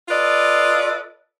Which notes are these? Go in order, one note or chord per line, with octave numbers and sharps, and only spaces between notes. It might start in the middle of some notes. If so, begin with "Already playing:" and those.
F4 A4 B4 D5 D#5